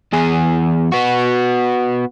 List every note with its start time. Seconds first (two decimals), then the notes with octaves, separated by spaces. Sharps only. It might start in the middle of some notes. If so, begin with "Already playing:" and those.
0.13 E2 G#4
0.92 B3 F#4